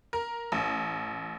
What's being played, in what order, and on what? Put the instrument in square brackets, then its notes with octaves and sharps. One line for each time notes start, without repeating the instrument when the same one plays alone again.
[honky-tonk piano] A#4
A1